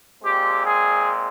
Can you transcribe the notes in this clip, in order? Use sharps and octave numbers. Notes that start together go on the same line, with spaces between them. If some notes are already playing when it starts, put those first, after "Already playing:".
A#2 G#3 C4 G4
G#4